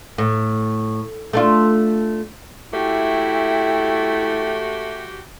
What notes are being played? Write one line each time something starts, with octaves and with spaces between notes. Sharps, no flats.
A2
A3 D4 F4
G#3 A3 E4 F#4 G4 G5